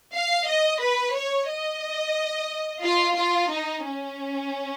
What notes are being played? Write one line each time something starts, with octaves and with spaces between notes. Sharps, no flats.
F5
D#5
B4
C#5
D#5
F4
F4
D#4
C#4